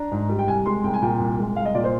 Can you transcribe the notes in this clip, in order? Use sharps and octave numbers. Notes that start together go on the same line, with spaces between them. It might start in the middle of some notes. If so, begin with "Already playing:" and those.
Already playing: D4 A#5
G#2
G3
G5
C2 G#5
G#3 C6
C2 G5
G#5
A#2 G5
C2
G#3
C2 F5
D#5
A#2 D5
C5